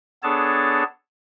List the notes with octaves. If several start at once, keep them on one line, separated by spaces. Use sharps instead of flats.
B3 D4 G#4 A4 C#5 A5